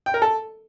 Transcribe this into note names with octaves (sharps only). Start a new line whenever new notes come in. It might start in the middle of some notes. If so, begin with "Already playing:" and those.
G5
A#4
A4